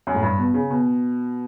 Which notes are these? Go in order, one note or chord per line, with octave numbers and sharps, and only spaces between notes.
F#2
A2
G2
B2
C#3
B2